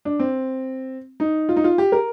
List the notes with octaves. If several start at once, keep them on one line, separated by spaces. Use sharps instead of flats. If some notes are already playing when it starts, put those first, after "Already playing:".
D4
C4
D#4
F4
D#4
F4
G4
A#4